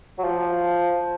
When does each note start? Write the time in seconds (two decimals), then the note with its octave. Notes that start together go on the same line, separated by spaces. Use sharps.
0.18 F#3
0.24 F3